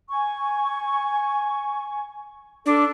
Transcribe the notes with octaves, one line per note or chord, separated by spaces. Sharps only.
G#5 C#6
D4 A4